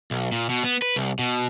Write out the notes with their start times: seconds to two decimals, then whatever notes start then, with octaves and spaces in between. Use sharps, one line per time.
0.11 B1
0.32 A#2
0.50 B2
0.64 B3
0.82 B4
0.96 C2
1.19 B2